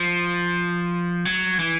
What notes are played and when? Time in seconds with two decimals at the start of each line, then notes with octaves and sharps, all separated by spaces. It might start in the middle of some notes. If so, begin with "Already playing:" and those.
Already playing: F3
1.25 F#3
1.59 E3